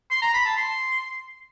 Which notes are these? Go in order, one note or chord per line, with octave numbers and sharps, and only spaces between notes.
C6
A#5
B5
A5
C6